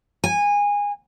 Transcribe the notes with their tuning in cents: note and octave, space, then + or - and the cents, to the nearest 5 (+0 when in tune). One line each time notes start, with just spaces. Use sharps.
G#5 -20